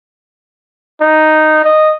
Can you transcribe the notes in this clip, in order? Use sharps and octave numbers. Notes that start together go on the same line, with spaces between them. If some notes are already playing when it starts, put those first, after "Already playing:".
D#4
D#5